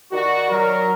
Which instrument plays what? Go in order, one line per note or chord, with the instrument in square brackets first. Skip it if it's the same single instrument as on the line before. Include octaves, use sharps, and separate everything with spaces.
[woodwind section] D#3 D5 C#6 [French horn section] F#4
[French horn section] F#3 [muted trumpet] A#4